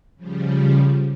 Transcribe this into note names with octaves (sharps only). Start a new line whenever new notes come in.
C#3 F3 G3